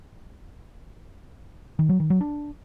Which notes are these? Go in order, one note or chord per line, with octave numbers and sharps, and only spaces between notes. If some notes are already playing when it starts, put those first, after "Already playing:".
D#3
F#3
D#3
F#3
D4